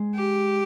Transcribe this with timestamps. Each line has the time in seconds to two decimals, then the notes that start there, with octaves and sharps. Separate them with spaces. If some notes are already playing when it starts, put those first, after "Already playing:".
Already playing: G#3
0.15 G4